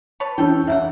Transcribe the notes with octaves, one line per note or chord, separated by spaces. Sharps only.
B4 C#5 A5
E3 C#4 A4 G5
C#3 A#3 E5 F#5